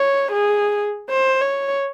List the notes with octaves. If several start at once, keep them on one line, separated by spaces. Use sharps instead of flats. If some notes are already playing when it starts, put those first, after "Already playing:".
Already playing: C#5
G#4
C5
C#5